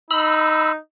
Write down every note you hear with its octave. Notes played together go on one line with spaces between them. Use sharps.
D#4 B5 E6